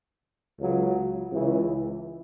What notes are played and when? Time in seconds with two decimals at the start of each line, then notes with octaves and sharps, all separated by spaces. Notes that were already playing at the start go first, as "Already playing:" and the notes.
0.59 C#2 C#3 F#3
1.32 C#2 C#3 E3